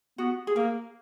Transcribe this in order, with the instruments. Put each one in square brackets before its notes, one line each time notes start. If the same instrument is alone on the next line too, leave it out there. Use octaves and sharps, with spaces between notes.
[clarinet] B3 [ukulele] F#4
[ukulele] G#4
[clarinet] A#3 [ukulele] A#4